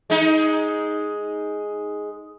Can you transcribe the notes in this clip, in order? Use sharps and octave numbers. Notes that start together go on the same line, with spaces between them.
G#3 D#4